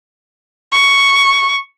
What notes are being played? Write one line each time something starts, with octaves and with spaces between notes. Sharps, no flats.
C#6